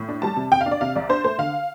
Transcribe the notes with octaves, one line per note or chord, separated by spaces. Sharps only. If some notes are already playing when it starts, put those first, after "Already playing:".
Already playing: A2
D4
G3 A5
C3
C3 G5
F5
D4
D5
C3 F5
C2 D5
D4 C5
A3 C5
D3 F5